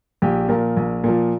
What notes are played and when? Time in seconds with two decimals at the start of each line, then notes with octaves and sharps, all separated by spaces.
0.22 A#1 G4
0.48 A#2 F3 A#4
0.77 A#1
1.04 A#2 F3